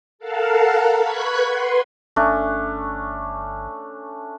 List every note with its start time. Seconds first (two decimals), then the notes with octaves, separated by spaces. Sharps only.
0.19 A4 A#4 F5 F#5 A5
0.98 B4 C#6 F#6 G#6 B6
1.43 B4 F#5 C6
2.16 G1 A3 C#4 D4